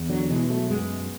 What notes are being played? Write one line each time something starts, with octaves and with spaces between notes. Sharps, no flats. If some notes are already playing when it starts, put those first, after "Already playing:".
Already playing: E2
D3 F#3
B2 E3 G#3
F#3 A3
F#2 G#3 B3